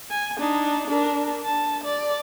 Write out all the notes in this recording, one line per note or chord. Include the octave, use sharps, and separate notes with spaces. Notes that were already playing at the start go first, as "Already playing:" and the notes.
G#5
D4 D#4
D4 A#4
A5
D5